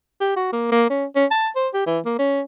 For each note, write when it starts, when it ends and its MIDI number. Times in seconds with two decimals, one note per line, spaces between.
0.21 0.36 67
0.36 0.49 66
0.53 0.67 58
0.72 0.86 58
0.90 1.05 61
1.15 1.25 61
1.31 1.48 81
1.56 1.68 72
1.74 1.84 67
1.86 1.99 52
2.05 2.18 58
2.19 2.41 61